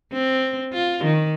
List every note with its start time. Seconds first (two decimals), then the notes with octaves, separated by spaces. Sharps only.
0.13 C4
0.73 F4
1.04 D#3